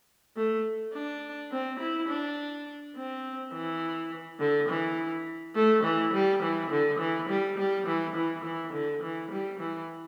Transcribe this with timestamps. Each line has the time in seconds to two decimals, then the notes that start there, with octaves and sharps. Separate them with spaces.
0.36 A3
0.93 D4
1.52 C4
1.80 E4
2.09 D4
2.96 C4
3.53 E3
4.40 D3
4.69 E3
5.56 A3
5.84 E3
6.13 G3
6.43 E3
6.71 D3
6.99 E3
7.29 G3
7.58 G3
7.87 E3
8.16 E3
8.44 E3
8.73 D3
9.03 E3
9.31 G3
9.60 E3